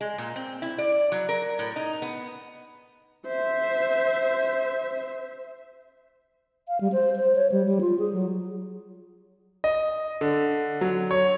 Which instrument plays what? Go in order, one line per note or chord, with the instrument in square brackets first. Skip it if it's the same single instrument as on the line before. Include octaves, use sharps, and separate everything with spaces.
[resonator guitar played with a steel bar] G#3
A#2
C4
E4
D5
F#3
A#4
A2
D#4
B3
[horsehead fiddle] C5 E5
[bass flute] F5
G3
C5
C5
C#5
G3
G3
F4
G#4
F#3
[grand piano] D#5
D3
F#3
C#5